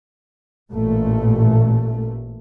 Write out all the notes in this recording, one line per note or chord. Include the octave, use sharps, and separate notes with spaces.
A1 A#2 A3